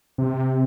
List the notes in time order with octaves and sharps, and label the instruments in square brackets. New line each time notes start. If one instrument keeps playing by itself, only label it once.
[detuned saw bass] C3